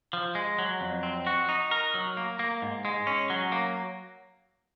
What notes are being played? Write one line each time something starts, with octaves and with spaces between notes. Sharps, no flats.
F3
G#3
F#3
F2
C4
F#4
D#4
A#4
F#3
A#3
A#3
G#2
G#3
C#4
F#3
A#3